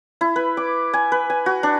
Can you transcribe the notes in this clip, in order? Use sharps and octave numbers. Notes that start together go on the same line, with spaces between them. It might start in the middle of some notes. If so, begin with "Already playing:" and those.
E4
B4
D6
G#5
B4
G#5
F#4
D4